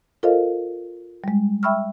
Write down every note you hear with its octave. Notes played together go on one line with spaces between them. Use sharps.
F4 A4 A#4 C5 D#5 F5
G3 G#3
E5 G5 B5 C#6 E6 F6